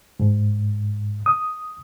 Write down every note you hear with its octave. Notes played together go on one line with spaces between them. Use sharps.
G#2
D#6